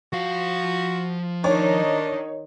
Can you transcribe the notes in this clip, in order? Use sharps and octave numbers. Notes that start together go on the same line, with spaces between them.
F3 F#4 F5
D#3 D4 D#4 C#5